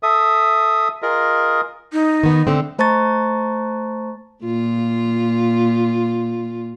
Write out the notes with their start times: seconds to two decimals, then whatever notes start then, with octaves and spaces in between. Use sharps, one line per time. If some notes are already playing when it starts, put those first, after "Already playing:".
0.03 A4 E5 D#6
1.02 F4 G#4 A#4 D#5
1.93 D#4
2.23 D#3 B3
2.47 D3 A3 C4
2.79 A3 C5 A5 A#5 C#6 A6
4.44 A#2 F4